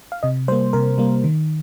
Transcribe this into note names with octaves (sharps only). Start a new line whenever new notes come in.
F5
C3 D#5
G3 A#3 C5
C3 A#4
G3 A#3
D#3